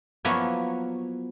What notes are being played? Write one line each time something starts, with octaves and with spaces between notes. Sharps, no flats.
F3 F#3 A#3 B3 E4 C#5